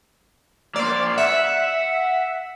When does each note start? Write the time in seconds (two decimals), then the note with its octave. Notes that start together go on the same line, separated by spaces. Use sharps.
0.76 A#3 C5 D5
1.18 E5 F#5